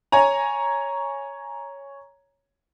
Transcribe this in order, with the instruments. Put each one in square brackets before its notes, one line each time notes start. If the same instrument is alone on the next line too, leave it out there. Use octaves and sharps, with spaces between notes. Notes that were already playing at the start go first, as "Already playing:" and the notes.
[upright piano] C#5 G#5 A#5